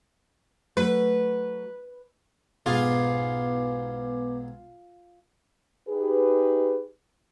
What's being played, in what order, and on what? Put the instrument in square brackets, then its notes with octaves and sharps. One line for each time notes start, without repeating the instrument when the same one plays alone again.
[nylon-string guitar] F#3 A3 [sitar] B4
[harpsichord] B1 G#2 G#4 [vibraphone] B3 B4 D6 [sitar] F4
[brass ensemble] D#4 G4 G#4 B4